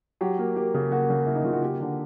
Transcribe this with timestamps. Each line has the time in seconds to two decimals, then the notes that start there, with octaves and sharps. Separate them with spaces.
0.21 F#3 G4
0.39 A#3
0.56 A#3 G4
0.74 C#3
0.92 A#3 F#4
1.10 C#3
1.26 A#3 E4
1.35 D#4
1.44 C#3 F4
1.53 F#4
1.62 A#3 G4
1.80 D3